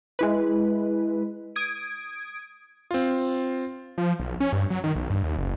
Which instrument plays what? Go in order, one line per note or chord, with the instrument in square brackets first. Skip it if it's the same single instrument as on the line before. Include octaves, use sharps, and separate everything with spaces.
[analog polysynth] G#3 E4 B4
D#6 G#6 D7
[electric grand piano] C4 F4
[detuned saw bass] F3
B1
C#4
G2
F#3
D#3
B1
G2
D#2
F#1